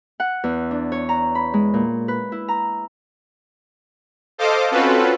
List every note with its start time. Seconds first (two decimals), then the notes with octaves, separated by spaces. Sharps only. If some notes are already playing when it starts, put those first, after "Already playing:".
0.20 F#5
0.44 E2
0.71 D4
0.92 C#5
1.09 A#5
1.35 B5
1.54 G#3
1.74 A#2
2.08 B4
2.32 E4
2.48 A#5
4.38 A4 C5 D#5 F5 D6
4.71 C4 C#4 F4 F#4 A4 B4